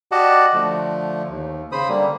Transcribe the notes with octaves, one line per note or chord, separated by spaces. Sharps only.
F#4 G4 D5 D#5 F#5 A5
D3 F3 A3
D#2
C#3 C5 B5 D#6
D3 G3 A#3